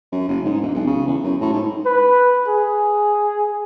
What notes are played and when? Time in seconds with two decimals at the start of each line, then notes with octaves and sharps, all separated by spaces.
0.12 F#2
0.28 F#1
0.45 G#2
0.61 E1
0.74 B1
0.87 C#3
1.07 E2
1.24 F#2
1.41 A2
1.52 G#2
1.86 B4
2.48 G#4